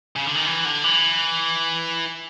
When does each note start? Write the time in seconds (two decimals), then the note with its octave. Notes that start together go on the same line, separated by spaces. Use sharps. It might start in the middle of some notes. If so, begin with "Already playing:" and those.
0.16 C#3
0.26 D3
0.35 D#3
0.46 E3
0.65 D3
0.84 E3